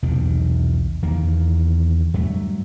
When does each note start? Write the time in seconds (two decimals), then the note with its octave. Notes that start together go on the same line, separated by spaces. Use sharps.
0.03 B1 E2 C3 D#3
1.03 E2 D#3 A#3
2.14 G2 F#3 A3